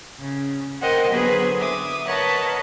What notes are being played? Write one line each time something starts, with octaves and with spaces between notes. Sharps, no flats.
C#3
A#4 C5 D#5 F#5 G5
D3 F#3 B3 G#4 B4 C5
E5 D6 D#6
A#4 B4 C#5 D#5 F#5 A5